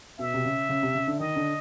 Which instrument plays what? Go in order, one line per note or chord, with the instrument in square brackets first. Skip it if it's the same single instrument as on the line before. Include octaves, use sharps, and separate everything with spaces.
[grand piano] B2 [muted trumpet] E5
[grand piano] C3
C#3
C#3
C3
C#3
D3
[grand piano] D#3 [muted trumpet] D#5
[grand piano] D3